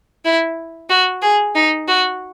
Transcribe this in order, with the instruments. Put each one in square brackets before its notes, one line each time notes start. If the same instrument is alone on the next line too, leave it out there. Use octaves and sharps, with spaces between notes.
[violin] E4
F#4
G#4
D#4
F#4